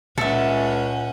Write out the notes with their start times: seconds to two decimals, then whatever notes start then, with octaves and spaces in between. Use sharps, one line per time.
0.18 C#2 A#2 C#4 A4 E5 F#5